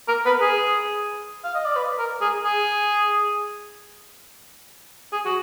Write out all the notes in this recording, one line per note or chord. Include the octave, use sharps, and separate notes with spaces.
A#4
B4
G#4
F5
D#5
D5
B4
A#4
G#4
G#4
G#4
F#4